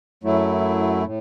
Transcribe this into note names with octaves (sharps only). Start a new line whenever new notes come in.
F#2 F#3 A3 E4
A2